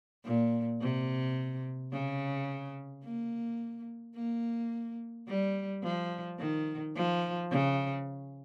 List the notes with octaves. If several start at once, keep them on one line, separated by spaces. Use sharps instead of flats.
A#2
C3
C#3
A#3
A#3
G3
F3
D#3
F3
C#3